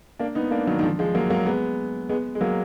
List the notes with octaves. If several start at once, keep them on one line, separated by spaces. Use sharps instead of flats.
A#3 D4
B3 D#4
A#3 D4
D#3 F#3
D#3
D3 F3
F3 G#3
F#3 A#3
F#3 A#3
G#3 B3
G#3 B3
G#3
F#3 A#3